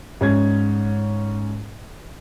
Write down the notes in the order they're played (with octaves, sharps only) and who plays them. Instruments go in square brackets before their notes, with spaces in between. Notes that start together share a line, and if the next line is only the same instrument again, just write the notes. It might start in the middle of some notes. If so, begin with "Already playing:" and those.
[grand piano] G#2 C#4 G#6